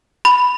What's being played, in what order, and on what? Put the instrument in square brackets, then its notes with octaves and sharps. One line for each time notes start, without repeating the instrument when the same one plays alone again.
[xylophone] B5